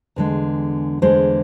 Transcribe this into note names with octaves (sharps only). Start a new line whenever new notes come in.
E2 D3 G#3
E2 D3 G#3 C5